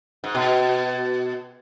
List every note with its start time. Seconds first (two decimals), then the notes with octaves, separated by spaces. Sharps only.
0.24 G#2
0.35 B2